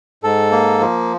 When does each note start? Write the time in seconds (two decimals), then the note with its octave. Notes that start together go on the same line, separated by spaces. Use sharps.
0.24 G#2 A4
0.51 A#3
0.80 F3